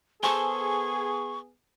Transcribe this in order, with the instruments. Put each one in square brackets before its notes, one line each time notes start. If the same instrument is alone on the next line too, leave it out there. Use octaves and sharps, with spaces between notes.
[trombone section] B3 G#4 [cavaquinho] A4 C5 G#5 [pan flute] C#6